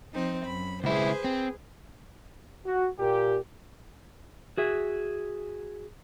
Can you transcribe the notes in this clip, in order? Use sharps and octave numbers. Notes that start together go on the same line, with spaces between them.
F3 C4 D#4
F#2 B5
C#2 E4 G#4 B4 C5
C4
F#4
A#2 G4
F#4 G#4 E5